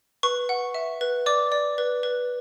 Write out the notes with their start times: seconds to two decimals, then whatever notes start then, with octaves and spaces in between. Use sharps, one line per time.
0.23 B4 C#6
0.49 F#5
0.74 E5
1.01 B4
1.26 D5 D6
1.52 D5
1.78 B4
2.03 B4